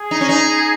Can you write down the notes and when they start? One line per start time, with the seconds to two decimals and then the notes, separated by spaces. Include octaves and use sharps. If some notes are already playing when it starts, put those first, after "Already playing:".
Already playing: G#4
0.11 D#4
0.21 C#4
0.29 D#4